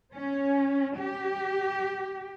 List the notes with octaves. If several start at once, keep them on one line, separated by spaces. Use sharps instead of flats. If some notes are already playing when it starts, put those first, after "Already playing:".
C#4
G4